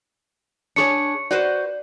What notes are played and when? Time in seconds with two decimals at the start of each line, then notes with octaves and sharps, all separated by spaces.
0.76 D4 G#4 C#5 C#6 C#7
1.31 F#4 B4 C5 D5